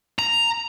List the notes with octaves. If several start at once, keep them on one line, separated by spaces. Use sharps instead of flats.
A#5